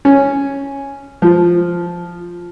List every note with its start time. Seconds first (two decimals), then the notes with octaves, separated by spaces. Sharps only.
0.05 C#4
1.22 F3